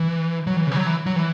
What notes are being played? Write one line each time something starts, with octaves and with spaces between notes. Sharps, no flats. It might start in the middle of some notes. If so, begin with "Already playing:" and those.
Already playing: E3
F#3
E3
C#3
E3
F#3
E3
F#3
E3